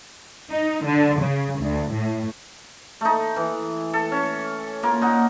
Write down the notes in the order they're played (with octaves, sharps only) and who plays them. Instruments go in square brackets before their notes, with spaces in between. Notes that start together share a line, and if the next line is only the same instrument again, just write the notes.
[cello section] D#4
D3
C#3
D2
A2
[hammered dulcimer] A3 D#4
E3
A4
C#4
A#3 F4
A#2 D#4 D#5 F#5